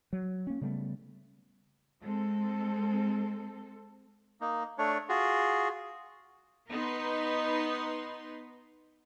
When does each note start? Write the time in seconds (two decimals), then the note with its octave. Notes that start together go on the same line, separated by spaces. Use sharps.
0.13 F#3
0.47 A#3 C#4
0.61 C#3 G3 A3 B3
2.02 G#3 C4 A4
4.41 A#3 D#4
4.78 A3 D4 C#5
5.09 F4 F#4 G#4
6.71 B3 D#4 B4 C6